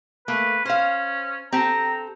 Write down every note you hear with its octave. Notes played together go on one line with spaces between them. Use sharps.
A3 A#3 B4
C#4 C5 F5
C4 G4 A4 A#5